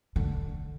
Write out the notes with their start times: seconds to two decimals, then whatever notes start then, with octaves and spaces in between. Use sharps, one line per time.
0.16 D3